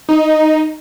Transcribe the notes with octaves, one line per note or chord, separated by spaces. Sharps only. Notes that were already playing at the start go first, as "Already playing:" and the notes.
D#4